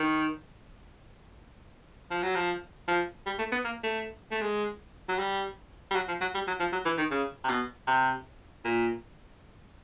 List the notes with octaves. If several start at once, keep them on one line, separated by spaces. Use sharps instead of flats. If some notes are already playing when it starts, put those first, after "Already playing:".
Already playing: D#3
F3
F#3
F3
F3
G3
A3
B3
A#3
A3
A3
G#3
F#3
G3
G3
F#3
F3
F#3
G3
F#3
F3
F#3
E3
D#3
C#3
C3
B2
C3
A#2